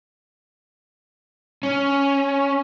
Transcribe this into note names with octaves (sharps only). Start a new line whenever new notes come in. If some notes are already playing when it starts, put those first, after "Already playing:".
C#4